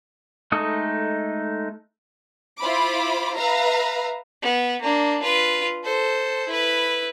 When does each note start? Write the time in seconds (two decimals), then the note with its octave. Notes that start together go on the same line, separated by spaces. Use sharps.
0.52 G#3 A3 D#4 A4 D#6
2.60 E4 F4 C5 B5 D6
3.36 B4 E5 F5 A#5
4.42 B3
4.81 A#3 D4
5.22 F4 B4
5.84 A4 C5
6.48 E4 B4